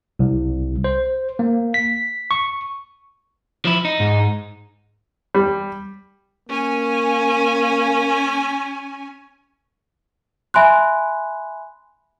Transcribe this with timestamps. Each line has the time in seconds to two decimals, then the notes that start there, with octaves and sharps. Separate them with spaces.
0.19 C2
0.84 C5
1.39 A#3
1.74 B6
2.31 C#6
3.65 F3 E4
3.85 D#4
4.00 G#2
5.34 G3
6.49 A#3 C#4 G#5
10.54 E5 G#5 B5 C6 F#6